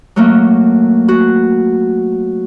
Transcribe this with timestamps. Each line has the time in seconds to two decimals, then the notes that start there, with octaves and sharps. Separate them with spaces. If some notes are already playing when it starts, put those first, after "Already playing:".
0.16 F#3 A3 A#3
1.08 F#4